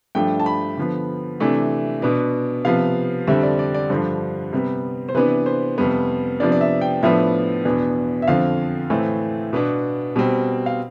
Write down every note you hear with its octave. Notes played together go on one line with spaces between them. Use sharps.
G2 F3 A3 D4 G5
A5
B5
D3 F3 B3
C3 E3 A3 D4
B2 B3 D4
C3 F3 B3 F5
F2 D3 G3 C4 E5
D5
D5
D5
G2 D3 F3 C5
C3 G3 B3
C5
C3 E3 B3 D4 B4
C5
F2 C3 G3 B3
C3 F3 B3 D4 D5
D5
E5
G5
A2 F3 B3 D4 E5
E2 B2 B3 D4
E5
F2 D3 F3 C4 F5
A2 E3 A3 C4
B2 B3 D4
B2 G3 C4
F5